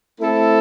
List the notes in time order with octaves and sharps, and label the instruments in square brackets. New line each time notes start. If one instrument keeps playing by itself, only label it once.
[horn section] A3 C4 E4 A4